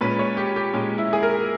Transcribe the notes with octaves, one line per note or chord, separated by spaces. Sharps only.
A#2 G#3 C#4 B4
C#5
G4
G4
A#2 G#3 C#4 G4
E4
G#4
A#4